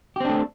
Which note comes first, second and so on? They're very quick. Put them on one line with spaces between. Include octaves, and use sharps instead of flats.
G4 C4 D4 A3